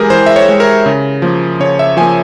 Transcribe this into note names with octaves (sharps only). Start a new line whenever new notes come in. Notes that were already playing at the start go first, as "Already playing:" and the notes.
Already playing: E3 G#3 G4 G#4 A#4
E3 C5
E5
C#5
G#3
A#4
C#3
F3 A#3
C#3 C#5
E5
F3 A#3 G#5